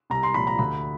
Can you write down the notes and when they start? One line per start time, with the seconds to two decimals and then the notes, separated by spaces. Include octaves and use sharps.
0.10 C2 A#5
0.23 C6
0.34 A#2 F3 B5
0.47 A#5
0.59 D2 B5